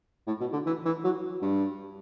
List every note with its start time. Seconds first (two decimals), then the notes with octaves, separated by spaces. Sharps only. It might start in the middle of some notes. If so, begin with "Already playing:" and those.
0.27 A2
0.40 B2
0.53 D3
0.66 E3
0.85 E3
1.04 F#3
1.42 G2